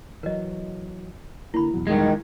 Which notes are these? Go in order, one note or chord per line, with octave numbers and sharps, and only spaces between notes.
E3 F#3 A#4 D#5
D3 A#3 E4 B5
E2 B2 F#3
G2 D#3 G#3